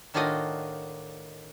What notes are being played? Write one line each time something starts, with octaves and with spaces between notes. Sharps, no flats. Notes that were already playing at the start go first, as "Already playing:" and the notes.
A2 D#3 D4 F4 F#4 D#5